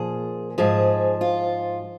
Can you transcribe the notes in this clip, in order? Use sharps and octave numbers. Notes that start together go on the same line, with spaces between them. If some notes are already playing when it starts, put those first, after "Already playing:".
Already playing: A#2 F3 G#4
G#2 F3 G#4
F4